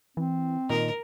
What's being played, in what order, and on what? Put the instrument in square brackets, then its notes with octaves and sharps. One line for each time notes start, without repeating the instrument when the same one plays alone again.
[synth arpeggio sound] E3 [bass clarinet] C4
[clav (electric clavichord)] A#2 D#3 [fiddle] A#4 [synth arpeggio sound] D#5